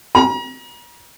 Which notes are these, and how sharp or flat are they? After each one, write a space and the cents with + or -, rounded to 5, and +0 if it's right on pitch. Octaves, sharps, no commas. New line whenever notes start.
A#5 +40